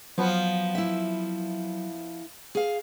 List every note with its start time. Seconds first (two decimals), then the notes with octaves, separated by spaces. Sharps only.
0.18 F3 F#3 B3
0.75 E4 E5
2.55 G#4 F5